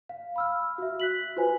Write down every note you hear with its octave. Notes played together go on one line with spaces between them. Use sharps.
F5
B5 E6 F6
F#4 E5
F#6 B6 F#7
F4 F#4 B4 C5 G#5